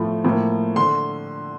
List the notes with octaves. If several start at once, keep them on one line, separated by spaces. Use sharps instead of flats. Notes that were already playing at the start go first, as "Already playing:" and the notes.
Already playing: A2 F3 A3
A2 F3 A#3
D3 C6